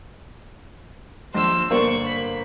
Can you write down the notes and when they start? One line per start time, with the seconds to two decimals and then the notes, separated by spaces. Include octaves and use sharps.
1.34 A#1 C5 E6
1.71 G1 A#3 C5 D5 C#6
2.07 B5